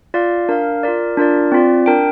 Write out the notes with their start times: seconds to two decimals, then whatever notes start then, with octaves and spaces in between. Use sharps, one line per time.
0.14 F4 D5 F5
0.49 D4 A#4 F5
0.83 F4 A#4 D5
1.17 D4 F4 A#4 D5
1.52 C4 F4 D5
1.86 D4 A#4 G5